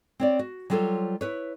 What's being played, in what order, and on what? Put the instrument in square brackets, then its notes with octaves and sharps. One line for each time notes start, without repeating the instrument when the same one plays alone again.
[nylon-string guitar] C4 C#5 D5
F#4
F#3 G3 F4 A4 C5 C#5
E4 B4 C#5